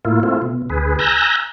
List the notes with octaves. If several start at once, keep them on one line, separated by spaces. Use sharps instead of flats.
A2 A#3 E4 F4
A3 C4 E4 F4
B2
D2 G#4 B4
G#5 A#5 E6 F#6 G6 A#6